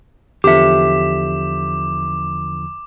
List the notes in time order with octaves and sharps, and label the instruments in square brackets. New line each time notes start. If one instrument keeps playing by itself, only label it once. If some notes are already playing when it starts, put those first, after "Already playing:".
[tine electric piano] E2 D3 F3 [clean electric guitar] G4 E5 [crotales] D6